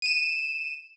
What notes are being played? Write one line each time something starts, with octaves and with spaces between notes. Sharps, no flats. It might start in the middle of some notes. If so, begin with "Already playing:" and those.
D#7 E7